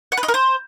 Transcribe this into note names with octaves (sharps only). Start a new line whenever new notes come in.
F#5
B4
D#5
A#4
C5